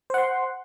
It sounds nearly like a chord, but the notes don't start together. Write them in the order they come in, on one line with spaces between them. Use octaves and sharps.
C5 F#5 C6